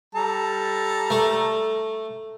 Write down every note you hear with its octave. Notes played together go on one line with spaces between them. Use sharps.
G3 A4 A#5
A3